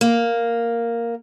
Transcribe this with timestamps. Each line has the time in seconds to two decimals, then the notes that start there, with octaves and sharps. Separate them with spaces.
0.01 A#3